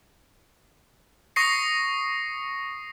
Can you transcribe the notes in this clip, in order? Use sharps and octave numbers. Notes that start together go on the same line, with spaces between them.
C#6 D#6 A#6 C7 C#7